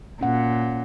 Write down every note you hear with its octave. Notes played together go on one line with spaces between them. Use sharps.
A#2 C#4 F#5